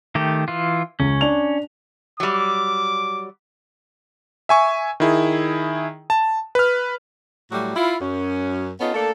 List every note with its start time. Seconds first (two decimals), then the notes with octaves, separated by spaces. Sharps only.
0.15 D#3 A3 G4
0.48 E3 F4
1.00 C#2 C#4
1.21 D4 F7
2.20 F#3 G3 D6
4.49 E5 G#5 C#6
5.00 D#3 E4 G#4
6.10 A5
6.55 B4 F6
7.51 A2 F#3 G3 A3 F#4
7.76 E4 F4
8.01 F#2 C#4
8.80 B3 C#4 D#4 F4 A4
8.94 A3 A#3 D4 A4